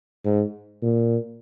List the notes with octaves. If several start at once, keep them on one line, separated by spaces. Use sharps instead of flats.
G#2
A#2